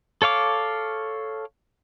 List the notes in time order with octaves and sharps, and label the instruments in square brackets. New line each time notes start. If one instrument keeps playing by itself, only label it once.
[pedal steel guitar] A4 C#5 F5 D6